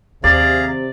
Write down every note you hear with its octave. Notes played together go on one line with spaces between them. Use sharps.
D#2 C3 G#4 D5 F5 A#5